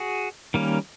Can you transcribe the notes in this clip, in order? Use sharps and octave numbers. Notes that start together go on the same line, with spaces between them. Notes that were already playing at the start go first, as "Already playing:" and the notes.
Already playing: F#4 G#4
D#3 G3 A#3 C#4